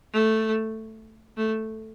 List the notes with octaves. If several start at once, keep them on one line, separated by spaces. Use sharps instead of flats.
A3
A3